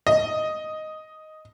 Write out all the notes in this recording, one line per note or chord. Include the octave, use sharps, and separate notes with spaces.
D#5